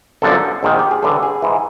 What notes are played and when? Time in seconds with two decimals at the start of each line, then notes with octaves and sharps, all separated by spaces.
0.22 G1 F#2 D3 F3 A4
0.63 A#1 G#2 D#3
0.79 G4
0.91 G#4
1.02 A1 G2 D3 A4
1.23 G#4
1.42 G#2 E3